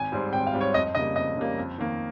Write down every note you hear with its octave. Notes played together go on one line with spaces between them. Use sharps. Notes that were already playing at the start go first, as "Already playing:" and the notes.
Already playing: G#1 G#5
G#2 G3 C4
G#1 G5
F5
G#2 G3 C4
C#5
F2 D#5
C#3 G3 A#3 D#5
F2 D#5
C#3 G3 A#3
F2
D#3 A#3